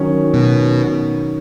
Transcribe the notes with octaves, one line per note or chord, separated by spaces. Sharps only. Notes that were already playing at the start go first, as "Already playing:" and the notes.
Already playing: D#3 F#3 C#4
B2